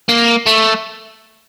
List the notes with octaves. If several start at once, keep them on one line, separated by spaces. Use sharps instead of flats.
A#3
A3